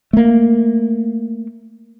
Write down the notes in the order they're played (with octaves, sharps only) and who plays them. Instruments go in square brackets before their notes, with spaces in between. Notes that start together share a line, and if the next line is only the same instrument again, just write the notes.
[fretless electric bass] A3 A#3